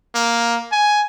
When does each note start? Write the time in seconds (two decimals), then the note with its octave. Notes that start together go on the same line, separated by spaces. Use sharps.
0.15 A#3
0.72 G#5